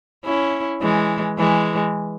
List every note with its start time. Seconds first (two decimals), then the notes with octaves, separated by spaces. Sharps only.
0.25 C#4 E4
0.81 E3 G#3
1.38 E3 G#3